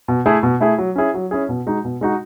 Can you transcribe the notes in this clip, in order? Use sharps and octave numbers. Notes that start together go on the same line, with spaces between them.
B2
A3 E4 G#4
B2
A3 E4 G#4
F#3
C#4 E4 G#4
F#3
C#4 E4 G#4
B2
G#3 D#4 F#4
B2
G#3 D#4 F#4